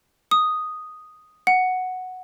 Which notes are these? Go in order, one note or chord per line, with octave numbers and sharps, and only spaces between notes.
D#6
F#5